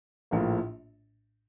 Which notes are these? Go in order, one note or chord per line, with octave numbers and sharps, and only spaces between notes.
A#1 A2 F3 A#3